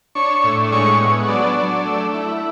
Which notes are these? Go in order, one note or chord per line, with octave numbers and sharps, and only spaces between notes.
D4 C#5 C#6
A2
G#3 C#5 C#6
B3
F#3 D4 D5
F#3
A3
E4